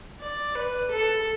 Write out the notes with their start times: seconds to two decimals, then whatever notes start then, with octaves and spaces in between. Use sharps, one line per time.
0.20 D5
0.56 B4
0.91 A4